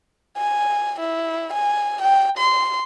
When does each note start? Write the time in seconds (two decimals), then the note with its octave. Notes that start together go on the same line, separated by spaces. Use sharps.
0.37 G#5
1.00 E4
1.53 G#5
2.01 G5
2.37 C6